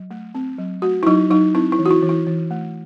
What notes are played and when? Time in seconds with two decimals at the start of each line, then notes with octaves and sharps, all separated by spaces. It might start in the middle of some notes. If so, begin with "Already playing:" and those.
Already playing: F#3
0.11 A3
0.35 C4
0.58 F#3
0.82 A3 F#4
1.03 E4
1.07 F#3 D#4
1.30 F#3 D#4
1.55 C4 E4
1.72 E4
1.79 E3
1.86 F#4
1.91 E4
2.03 E3
2.09 E4
2.27 E3
2.51 A3